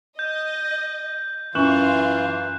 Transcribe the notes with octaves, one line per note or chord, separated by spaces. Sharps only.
D#5 G6
F#2 E3 F4 F5 C#6 F#6 E7 F#7